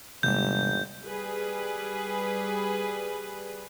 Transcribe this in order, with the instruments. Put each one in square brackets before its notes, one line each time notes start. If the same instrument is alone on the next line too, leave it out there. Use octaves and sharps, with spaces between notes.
[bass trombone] G1 [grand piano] D#2 G#2 E3 [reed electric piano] C3 G3 [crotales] G6
[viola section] G3 G#4 B4